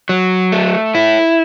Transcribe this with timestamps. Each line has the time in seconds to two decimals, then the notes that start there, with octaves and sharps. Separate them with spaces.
0.09 F#3
0.52 A3
0.95 E4